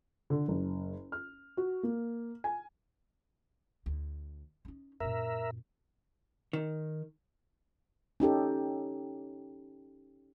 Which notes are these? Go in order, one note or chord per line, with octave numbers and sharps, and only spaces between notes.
D3
F#1
F6
F#4
A#3
G#5
D2
C#4 D#4
F#2 A#2 A#4 E5
D#3
C#4 D#4 G4 A4